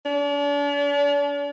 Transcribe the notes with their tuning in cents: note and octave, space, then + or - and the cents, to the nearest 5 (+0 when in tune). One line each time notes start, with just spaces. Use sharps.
D4 -40